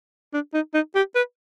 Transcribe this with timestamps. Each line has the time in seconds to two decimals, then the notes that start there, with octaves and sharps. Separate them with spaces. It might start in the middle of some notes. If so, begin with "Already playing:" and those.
0.33 D4
0.54 D#4
0.74 D#4
0.95 G4
1.15 B4